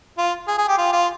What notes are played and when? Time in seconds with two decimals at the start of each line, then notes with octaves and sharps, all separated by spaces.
0.18 F4
0.48 G#4
0.58 G#4
0.68 G4
0.78 F4
0.93 F4